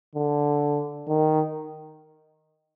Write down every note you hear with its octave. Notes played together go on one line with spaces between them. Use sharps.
D3
D#3